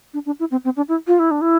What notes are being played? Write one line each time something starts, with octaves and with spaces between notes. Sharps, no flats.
D4
D4
E4
C4
C4
D4
E4
F4
E4
D4
E4